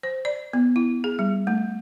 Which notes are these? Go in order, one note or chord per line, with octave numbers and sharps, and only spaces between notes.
C5
D5
B3
E4
G#4
G3
A3